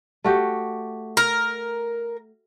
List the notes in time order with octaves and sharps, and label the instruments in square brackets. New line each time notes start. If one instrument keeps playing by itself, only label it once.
[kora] A3 F#4 G4
[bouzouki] A#4